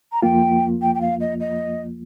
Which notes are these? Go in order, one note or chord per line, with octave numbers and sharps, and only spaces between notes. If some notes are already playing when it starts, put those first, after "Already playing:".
A#5
F2 F3 A#3 F4 G5
G5
G5
F5
D#5
D#5